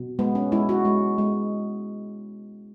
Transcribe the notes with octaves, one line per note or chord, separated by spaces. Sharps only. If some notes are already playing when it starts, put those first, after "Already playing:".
Already playing: B2
G#3 B3
C#4
G#3 E4
F#4
G#3
G#3